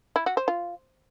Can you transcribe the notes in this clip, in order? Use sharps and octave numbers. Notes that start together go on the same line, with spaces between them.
E4
F#4
C5
F4